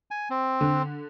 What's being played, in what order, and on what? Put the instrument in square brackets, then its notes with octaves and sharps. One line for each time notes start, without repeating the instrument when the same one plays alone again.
[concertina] G#5
C4
[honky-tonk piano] D3